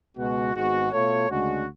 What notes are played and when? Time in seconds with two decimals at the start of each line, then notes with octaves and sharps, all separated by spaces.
0.17 C#2 B2 G#3 B3 F#4
0.55 G#1 G#2 G#3 B3 F#4
0.92 B2 A3 F4 A4 C#5
1.29 D2 C#3 G#3 D4 F#4